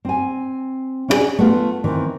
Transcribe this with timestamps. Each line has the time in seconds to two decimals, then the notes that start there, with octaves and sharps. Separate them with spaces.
0.05 C4 G#5
1.08 C#4 D4 E4 F#4 G#4 D5
1.39 A3 B3 F4
1.84 D#3 E3 C4